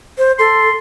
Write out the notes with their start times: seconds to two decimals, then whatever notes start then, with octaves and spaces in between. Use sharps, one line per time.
0.18 C5
0.39 A4 C6